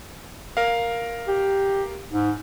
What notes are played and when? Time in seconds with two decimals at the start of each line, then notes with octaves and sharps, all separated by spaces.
0.57 A#4 F5
1.28 G4
2.11 G#2